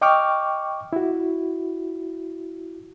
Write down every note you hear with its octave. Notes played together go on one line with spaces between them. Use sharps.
D#5 G5 C#6 D6 F6
E4 F#4